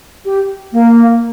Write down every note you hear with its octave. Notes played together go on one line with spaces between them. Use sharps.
G4
A#3